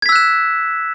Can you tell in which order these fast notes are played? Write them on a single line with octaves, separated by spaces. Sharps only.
G#6 B6 E6 F#6 E7